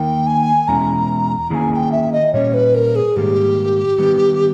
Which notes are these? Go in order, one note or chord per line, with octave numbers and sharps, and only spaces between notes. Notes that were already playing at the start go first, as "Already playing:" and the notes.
Already playing: D#3 A#3 D#4 A#4 G5
G#5
E2 B2 G#3 C#4 E4 A#5
D#3 A#3 C#4 E4 G#4 G#5 A#5
G#5
G5
E5
D#5
A#2 G3 C#4 C#5
B4
A#4
G#4
G#2 D#3 G3 A#3 G4
D#3 G3 B3